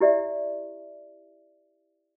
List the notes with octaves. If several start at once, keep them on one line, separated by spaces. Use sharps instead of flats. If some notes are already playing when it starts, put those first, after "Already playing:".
E4 G4 D5 E5